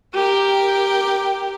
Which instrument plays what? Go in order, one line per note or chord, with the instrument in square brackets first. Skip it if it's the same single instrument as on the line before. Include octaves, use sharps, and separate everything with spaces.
[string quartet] G4 A#4 G5